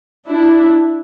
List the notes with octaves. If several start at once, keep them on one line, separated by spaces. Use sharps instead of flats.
D4 E4